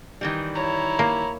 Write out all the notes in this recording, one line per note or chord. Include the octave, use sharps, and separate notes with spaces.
D#3 E3 G3
E4 C#5 A#5
A#3